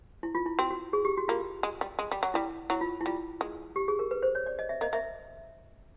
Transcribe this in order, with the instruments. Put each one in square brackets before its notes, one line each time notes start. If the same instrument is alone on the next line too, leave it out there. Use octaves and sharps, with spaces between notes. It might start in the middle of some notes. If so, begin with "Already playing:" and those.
[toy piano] E4
F4
E4
[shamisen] C4 [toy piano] F#4
[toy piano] F#4
G#4
G4
F#4
[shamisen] A#3 [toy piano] F4
[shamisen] G#3
G3
G#3
G3
F#3
[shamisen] G3 [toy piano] E4
[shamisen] F#3 [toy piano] E4
[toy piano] F4
E4
[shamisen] G3 [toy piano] F4
[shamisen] G#3
[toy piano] G4
G#4
A#4
B4
C5
C#5
D5
D#5
E5
[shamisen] A#3 [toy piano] D#5
[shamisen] A#3 [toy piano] E5